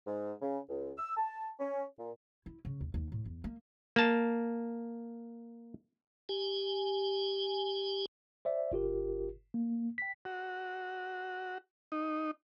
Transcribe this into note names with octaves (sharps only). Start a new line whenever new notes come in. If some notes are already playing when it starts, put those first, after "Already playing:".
G#2
C#3
C#2
E6
A5
C#4
A#2
E4
C#3
D#2
D#2
A2
E2
A#3
A#3 A5
G4 G#5
C5 D5 E5
G1 F4 G4 A#4
A#3
G5 B6
F#4
D#4